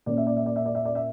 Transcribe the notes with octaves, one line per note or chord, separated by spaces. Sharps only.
A#2 A#3 C#4 D5
E5
D5
E5
D5
E5
D5
E5
D5
E5